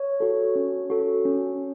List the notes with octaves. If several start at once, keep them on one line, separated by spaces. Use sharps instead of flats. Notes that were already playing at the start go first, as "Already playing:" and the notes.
Already playing: C#5
F#4 A4
C#4
F#4 A4
C#4